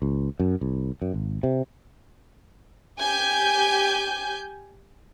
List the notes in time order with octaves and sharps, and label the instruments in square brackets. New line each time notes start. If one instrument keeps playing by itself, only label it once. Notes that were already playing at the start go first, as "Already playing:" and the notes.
[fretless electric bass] C#2
F#2
C2
F#2
G#1
C3
[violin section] G4 G#5 G6